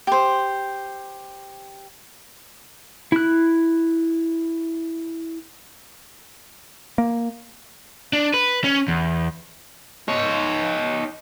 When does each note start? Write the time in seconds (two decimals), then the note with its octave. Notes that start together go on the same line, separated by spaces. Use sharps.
0.07 G4 C5
3.12 E4 F#6
6.98 A#3
8.13 D4
8.34 B4
8.64 C#4
8.88 E2
10.08 D#4 C#5